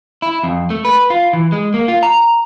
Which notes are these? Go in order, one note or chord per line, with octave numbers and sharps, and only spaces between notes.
E4
F2
A3
B4
F4
E3
G#3
A#3
F4
A#5